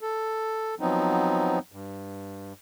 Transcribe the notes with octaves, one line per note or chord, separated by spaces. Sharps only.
A4
F3 F#3 B3 C4 D#4
G2